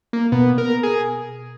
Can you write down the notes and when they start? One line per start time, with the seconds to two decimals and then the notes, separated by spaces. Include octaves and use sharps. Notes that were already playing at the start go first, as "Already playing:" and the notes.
0.13 A#3
0.32 B2 B3
0.58 A#4
0.83 G#4